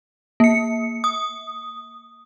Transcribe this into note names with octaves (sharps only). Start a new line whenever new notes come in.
A#3 C#7
D#6